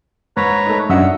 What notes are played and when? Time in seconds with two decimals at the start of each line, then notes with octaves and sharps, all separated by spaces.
0.37 G#2 B4 C#5 A#5
0.66 A3 D#4
0.90 F#2 D4 D#5 E5 F#5 E6